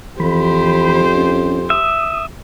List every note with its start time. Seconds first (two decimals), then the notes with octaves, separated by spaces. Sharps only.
0.20 F2 E3 G4 C5 B5
1.15 C#4
1.70 E5 D#6